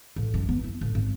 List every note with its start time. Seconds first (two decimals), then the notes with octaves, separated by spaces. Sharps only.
0.16 A1
0.34 F#2
0.49 B3
0.64 E4
0.81 A1
0.95 G#1